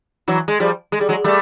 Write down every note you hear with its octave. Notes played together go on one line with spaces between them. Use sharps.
E3 F#3
G#3
F3 G3
G#3
G3
F#3 G#3
G3 A3